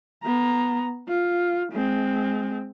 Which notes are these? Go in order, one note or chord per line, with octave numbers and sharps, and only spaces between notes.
B3 A#5
F4
G#3 C4